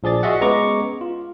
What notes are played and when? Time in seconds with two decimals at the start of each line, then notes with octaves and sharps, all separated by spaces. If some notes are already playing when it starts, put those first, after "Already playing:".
0.03 A#1 F3 G#4 D5 A6
0.23 F4 F#4 G#4 D#5 E5 F#5
0.41 G#3 B3 C#4 A#5 C#6 D6
1.01 F4